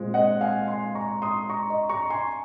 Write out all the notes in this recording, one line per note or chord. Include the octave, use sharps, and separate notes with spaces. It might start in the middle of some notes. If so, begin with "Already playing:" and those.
Already playing: A#2 G#3 C4
D#5 F#5
F5 G#5
G#5 C6
A#5 C#6
C6 D#6
A#5 C#6
D#5
A#5 C#6
G#5 C6